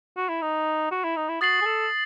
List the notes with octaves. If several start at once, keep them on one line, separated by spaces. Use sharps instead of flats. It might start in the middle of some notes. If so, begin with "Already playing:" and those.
F#4
E4
D#4
F#4
E4
D#4
E4
F#4 D#6 A6 C7 F#7
G#4
A4